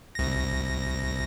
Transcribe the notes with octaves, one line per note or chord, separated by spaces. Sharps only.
C2 A#6